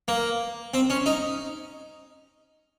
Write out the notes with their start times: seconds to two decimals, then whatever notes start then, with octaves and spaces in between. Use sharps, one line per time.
0.08 A#3
0.74 C4
0.90 C#4
1.06 D#4